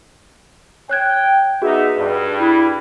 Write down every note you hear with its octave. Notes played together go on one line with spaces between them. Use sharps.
C#5 G5 F#6 G#6
B3 D#4 F#4 G#4 E5
G2
E4